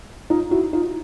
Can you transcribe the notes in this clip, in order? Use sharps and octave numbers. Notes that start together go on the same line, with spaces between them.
D#4 F4
E4 F#4
D#4 F4